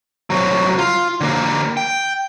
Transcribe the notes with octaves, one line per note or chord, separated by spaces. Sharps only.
C2 F#3
F4
D3 A#3
G5